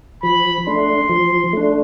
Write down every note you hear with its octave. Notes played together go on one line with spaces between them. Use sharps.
F3 B5
A3 D4 C6
F3
A3 D4